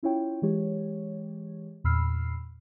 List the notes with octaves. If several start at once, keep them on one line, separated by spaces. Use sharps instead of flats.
C#4 E4 F4 C#5 G5
E3 G#3 G4 C#5
E2 A#2 B5 E6 F6 C7